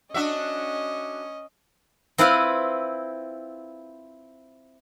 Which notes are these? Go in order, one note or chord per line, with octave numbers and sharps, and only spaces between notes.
C#4 D4 F#4 D#5 E5
C4 E4 F4 B4 F5 B5